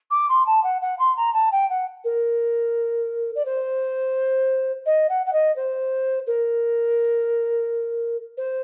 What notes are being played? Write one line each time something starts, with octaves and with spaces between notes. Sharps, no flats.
D6
C6
A5
F#5
F#5
C6
A#5
A5
G5
F#5
A#4
D5
C5
D#5
F#5
F#5
D#5
C5
A#4
C5